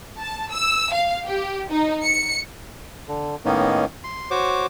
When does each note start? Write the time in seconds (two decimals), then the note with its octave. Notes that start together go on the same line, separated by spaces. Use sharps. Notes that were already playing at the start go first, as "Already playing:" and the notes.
0.21 A5
0.51 E6
0.93 F5
1.25 G4
1.69 D#4
2.04 C#7
3.08 D3
3.45 A2 D#3 A#3 B3 C#4 D#4
4.04 C6
4.31 F#4 C5 C#5 D6